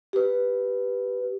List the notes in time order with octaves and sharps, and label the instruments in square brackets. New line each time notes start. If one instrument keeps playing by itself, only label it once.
[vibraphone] G4 B4